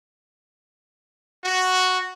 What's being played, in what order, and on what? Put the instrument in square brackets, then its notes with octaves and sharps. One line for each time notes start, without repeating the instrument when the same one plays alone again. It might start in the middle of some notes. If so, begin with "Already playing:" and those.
[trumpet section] F#4